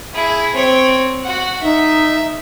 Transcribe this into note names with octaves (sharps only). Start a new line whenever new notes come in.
E4 G#4
C4 C#5
F#4 F#5
D#4 E5